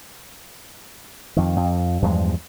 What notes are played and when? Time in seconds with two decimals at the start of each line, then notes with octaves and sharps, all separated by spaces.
1.37 F2 D#3
1.56 F2
2.02 E2 G2 F3 G#3